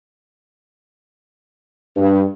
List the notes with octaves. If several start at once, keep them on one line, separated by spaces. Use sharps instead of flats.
G2